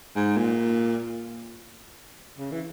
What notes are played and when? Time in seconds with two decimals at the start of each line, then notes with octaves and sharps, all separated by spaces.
0.15 G#2
0.37 A#2
2.38 C#3
2.52 E3